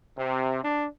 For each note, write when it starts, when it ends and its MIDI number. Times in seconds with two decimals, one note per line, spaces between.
0.18 0.61 48
0.64 0.87 62